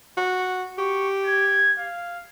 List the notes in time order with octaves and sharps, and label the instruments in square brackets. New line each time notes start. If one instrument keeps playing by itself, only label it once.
[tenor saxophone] F#4
[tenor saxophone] G4 [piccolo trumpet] C#6
[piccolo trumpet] G#6
F5